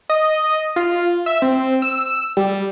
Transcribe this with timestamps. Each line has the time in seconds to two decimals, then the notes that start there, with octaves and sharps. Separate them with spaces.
0.09 D#5
0.76 F4
1.26 E5
1.42 C4
1.82 E6
2.37 G3